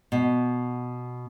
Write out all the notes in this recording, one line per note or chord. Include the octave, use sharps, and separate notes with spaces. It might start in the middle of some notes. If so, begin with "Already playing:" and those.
B2